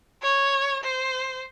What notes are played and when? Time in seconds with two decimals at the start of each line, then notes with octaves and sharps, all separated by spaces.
0.23 C#5
0.84 C5